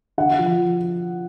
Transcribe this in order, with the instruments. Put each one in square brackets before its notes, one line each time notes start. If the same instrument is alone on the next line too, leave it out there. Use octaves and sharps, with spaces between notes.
[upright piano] D3 F#5
F3